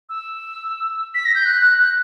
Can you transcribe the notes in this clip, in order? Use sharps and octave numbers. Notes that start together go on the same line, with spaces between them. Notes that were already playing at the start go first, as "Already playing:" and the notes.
E6
B6
A#6
G6
F#6
F#6
F#6